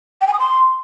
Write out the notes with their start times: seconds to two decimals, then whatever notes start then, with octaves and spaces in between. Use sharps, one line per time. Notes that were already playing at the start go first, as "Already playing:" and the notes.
0.21 G5
0.27 G#5
0.33 D#6
0.39 C6